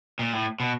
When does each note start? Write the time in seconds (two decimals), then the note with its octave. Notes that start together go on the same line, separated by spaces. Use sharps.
0.19 A#2
0.33 A2
0.60 B2